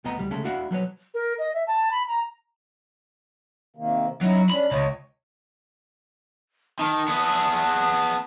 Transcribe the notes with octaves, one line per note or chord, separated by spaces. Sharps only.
C2 A2 B3 D#5 A#5
D2 G3
C#3 G#3 A3 A4
D4 E4 F#4 F5 F#5
F#3 G3 B4 C#5
A#4
D#5
E5
A5
B5
A#5
C3 D#3 A#3
F#3 C#4 D#4 E4
C#4 D4 B5
C#2 C#5 D#5
D#3 A5
B3 G#4